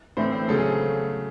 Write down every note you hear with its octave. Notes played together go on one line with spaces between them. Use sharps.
A2 E3 A3 C4 C5
C5
C#3 F#3 A3 A4
G#4